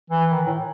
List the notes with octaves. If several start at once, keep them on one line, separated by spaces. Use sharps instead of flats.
E3
D#3
A2